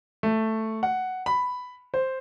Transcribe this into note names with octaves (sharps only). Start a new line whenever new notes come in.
A3
F#5
B5
C5